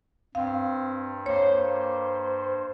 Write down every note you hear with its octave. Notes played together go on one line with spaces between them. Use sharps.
G2 C4 F5
A#3 C5 C#5